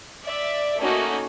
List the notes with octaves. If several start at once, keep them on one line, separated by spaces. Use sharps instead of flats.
D5 E5
A3 A#3 C#4 D#4 F#4